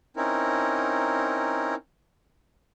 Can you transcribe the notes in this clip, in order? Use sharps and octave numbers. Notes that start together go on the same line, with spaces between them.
C4 C#4 D#4 E4 A#4